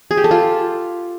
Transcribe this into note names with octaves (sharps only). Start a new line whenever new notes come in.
G#4
G4
A4
F4